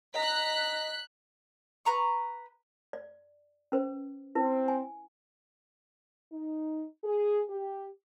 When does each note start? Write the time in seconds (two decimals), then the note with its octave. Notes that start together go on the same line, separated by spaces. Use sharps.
0.14 D#5 A#5 F#6 B6
1.85 B4 A#5 C#6
2.93 D5
3.72 C#4 B4 C5
4.35 C4 E4 B4
4.68 G#5
6.32 D#4
7.04 G#4
7.49 G4